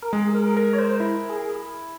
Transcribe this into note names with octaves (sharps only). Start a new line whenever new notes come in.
A#4
G#3 G#4
A#4
A#4
C#5
C5
E4
G#4